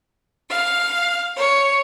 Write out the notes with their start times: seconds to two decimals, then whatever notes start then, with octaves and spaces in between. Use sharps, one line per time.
0.49 F5
1.35 C#5